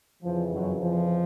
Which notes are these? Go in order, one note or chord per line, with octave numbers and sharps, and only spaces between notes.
F2 C#3 E3 F3
F#2 F#3
F3